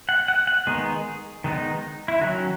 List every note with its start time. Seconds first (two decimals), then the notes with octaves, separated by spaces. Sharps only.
0.09 F#5
0.28 F#5
0.47 F#5
0.67 D#3 G#3 B3 D#4 G#4
1.44 D#3 G#3 B3 D#4
2.08 E4
2.21 D#3 F#3 C#4 F#4